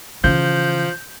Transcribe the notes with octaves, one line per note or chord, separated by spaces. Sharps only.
C#3 E3 F3 G6